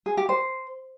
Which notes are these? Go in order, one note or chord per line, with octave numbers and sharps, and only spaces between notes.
G#4
G4
C5